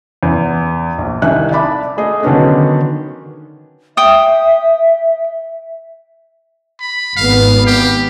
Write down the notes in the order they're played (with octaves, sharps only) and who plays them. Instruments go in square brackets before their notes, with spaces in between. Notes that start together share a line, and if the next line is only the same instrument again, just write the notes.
[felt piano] E2
A#1
C2 D#3 E5 G#5 F#6
D5 E5 A5 B5 D6
A3 G#4 D#5
D3 D#3 F#3 B3 C#4 D4
[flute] E5 [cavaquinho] G5 D#6
[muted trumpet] B5
[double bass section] G#1 B3 [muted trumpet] F5
[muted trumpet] G4